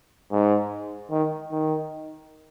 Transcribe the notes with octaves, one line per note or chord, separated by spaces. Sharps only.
G#2
D#3
D#3